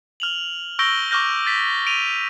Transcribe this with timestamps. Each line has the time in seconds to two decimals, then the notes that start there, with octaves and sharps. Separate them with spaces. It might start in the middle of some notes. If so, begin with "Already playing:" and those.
0.20 F6 F7 F#7
0.79 C#6 E6 G6 A#6 D7 G7
1.11 C#6 D6 F6 G6 A#6
1.46 A6 B6
1.86 D7 D#7 F7